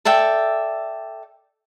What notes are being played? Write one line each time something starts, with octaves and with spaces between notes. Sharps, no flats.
A4 D5 E5 G5